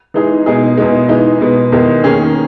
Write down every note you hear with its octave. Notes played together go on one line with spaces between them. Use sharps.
E3 G#3 D#4 G#4
B2 G#3 D#4 G#4
E2 B2 G#3
E3 G#3 D#4
B2 G#3 B3
E2 D#3 G#3 D#4 G#4
D#3 A#3 C#4 G#4